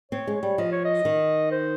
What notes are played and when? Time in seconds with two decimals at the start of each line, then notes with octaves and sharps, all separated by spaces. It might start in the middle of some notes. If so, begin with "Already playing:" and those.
0.11 C4 C#5
0.27 G#3
0.35 C#5
0.43 G3
0.58 F3 D#5
0.72 C#5
0.85 D#5
1.05 D#3
1.51 C5